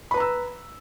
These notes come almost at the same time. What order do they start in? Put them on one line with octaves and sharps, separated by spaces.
B5 B4 A#5 E6